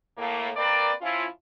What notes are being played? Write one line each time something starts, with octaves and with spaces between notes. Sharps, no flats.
A2 A#3
A#3 C4 A#4 B4 D5
F3 C#4 E4 F4